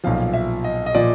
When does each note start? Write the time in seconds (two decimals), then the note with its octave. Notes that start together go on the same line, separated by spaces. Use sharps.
0.04 B1 A#2 F3 F5
0.34 E5
0.64 D#5
0.86 D#5
0.94 A#2 F3 D5